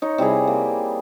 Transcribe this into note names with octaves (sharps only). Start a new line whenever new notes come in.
D#4 C#5
C3 G3 E4 G#4
A#3